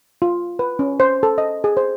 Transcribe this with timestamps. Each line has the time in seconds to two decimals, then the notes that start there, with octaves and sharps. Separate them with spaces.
0.22 F4
0.59 B4
0.79 C#4
1.00 C5
1.23 A4
1.38 D#5
1.64 G#4
1.77 C5